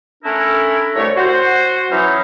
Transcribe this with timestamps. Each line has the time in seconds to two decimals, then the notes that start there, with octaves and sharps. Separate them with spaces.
0.24 A3 C#4 D4 E4 A#4
0.94 C2 A3 C#5
1.15 F#4 C5
1.91 E3 F#3 C#4 D#4